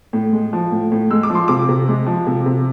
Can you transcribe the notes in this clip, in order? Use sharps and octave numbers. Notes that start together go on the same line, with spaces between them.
A2
G#3
F3
A2
A2
G#3 E6
D6
F3
C6
C3 D6
C3
G#3
F3
C3
C3